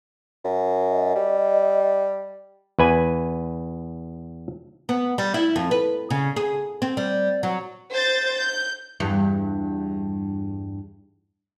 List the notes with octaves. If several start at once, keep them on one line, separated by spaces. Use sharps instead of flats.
F#2
D#5
G3
E2 B4 G#5
B3
G3
E4
F2
B4
C#3
G#4
C4
G3
F#3
C5 G6 A6
G6
E2 G2